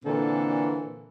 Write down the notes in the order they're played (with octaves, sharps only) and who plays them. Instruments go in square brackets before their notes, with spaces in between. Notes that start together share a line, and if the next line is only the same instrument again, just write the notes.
[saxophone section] A#2 D3 E3 C4 A4